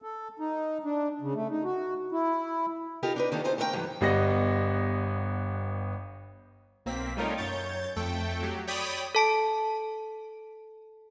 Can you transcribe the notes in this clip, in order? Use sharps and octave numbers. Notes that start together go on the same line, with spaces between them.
A4
D#4
D4
C#3
A3
D#4
F#4
E4
D#4 F4 G4 A4 A#4
D4 D#4 B4
D#3 A#3 C#4 D4 G4 A4
D#4 F4 G#4 A4 C5
A3 D4 A#4 D#5 G5
G2 D#3 E3 F#3 G3
G1 G3 B3 D#5 F#5 A#6
B1 A#3 C4 B6
G3 A3 D#4 F4 A#4 C#5
F#2 C#5 G6 A6
F2 A3 A4 G5
F#3 G4
C#5 D5 G5 B5 D#6
A4 A5 D7